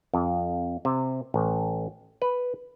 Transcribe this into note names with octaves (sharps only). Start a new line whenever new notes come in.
F2
C3
A1
B4